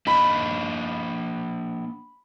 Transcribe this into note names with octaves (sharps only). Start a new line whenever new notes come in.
A#3 D4 D#5 B5